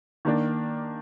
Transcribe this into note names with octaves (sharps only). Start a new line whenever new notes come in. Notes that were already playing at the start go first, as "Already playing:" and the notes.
D#3 A#3 D4